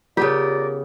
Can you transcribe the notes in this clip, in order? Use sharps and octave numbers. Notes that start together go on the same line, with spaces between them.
C#3 B3 F4 G4 A#4 D5